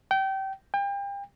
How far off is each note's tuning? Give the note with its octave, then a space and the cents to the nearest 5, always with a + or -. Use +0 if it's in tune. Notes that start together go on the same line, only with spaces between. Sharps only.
G5 -25
G5 +35